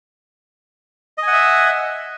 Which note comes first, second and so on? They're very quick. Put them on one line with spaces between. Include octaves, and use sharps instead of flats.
D#5 G#5 F#5 E5